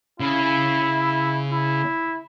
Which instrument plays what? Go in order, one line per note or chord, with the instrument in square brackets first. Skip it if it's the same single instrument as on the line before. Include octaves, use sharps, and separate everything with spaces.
[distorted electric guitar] C#3 [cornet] E4
[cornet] E4